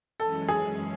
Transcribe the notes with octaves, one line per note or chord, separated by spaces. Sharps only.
F#2 E3 G#3 C#4 A4
G#4